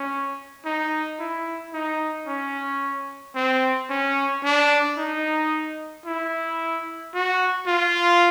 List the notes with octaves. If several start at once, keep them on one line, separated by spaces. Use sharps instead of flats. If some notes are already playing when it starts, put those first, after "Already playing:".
Already playing: C#4
D#4
E4
D#4
C#4
C4
C#4
D4
D#4
E4
F#4
F4